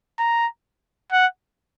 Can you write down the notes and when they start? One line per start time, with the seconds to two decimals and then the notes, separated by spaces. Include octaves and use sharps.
0.19 A#5
1.12 F#5